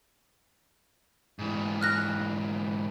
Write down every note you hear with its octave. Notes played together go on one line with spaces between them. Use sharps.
G#2 E3
F6 F#6 A#6